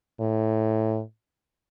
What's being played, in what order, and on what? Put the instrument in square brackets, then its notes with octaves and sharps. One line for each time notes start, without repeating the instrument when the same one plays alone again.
[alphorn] A2